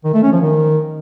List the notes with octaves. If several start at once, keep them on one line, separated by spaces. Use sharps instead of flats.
D#3
A3
C#4
F3
D#3